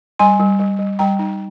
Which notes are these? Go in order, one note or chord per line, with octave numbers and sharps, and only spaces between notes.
G3 G#5 C6
G3
G3
G3
G3 G5 A#5
D#4